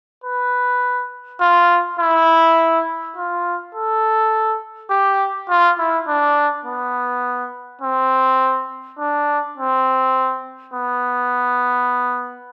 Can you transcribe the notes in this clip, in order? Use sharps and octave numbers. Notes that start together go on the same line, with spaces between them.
B4
F4
E4
F4
A4
G4
F4
E4
D4
B3
C4
D4
C4
B3